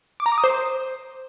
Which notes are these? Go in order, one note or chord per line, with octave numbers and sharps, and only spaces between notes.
D6
A#5
D6
D#6
C5